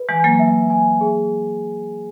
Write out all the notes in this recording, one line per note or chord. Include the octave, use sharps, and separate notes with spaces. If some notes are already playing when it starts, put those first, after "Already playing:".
Already playing: B4
E3 G#3 G#5
F#3 A#3
E5
G#5
G#4